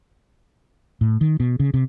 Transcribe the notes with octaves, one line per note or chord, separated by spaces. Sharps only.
A2
D#3
B2
C#3
C3